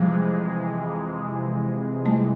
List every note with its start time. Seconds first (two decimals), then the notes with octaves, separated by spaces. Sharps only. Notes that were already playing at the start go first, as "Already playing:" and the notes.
Already playing: F2 C3 E3 F3 G3 G#3
2.05 G3 A3